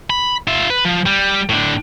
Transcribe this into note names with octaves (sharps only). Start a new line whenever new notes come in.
B5
F4 E5
B4
F3
G3
A2 D4